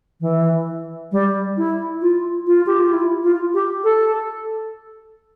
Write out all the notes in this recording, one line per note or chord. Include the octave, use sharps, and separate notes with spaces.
E3
G3
E4
F4
F4
G4
F4
E4
F4
G4
A4